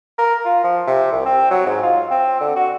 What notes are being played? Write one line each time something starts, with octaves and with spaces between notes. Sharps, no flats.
A#4
F4
F3
C3
C2
C4
F#3
G#2
F4
C4
D3
F#4